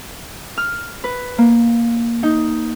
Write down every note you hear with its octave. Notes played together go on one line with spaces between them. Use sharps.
F6
B4
A#3
D#4